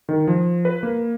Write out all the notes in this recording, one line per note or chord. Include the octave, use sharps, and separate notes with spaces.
D#3
F3
B4
A#3